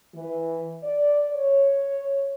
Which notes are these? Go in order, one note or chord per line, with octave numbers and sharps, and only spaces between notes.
E3
D5
C#5